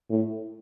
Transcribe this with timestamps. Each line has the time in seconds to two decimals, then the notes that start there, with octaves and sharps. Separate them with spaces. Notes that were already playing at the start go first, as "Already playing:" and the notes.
0.10 A2